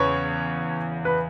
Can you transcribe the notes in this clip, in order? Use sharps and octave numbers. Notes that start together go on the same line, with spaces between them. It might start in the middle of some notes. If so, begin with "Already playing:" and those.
Already playing: E2 C#3 E3 B4 C#5
B4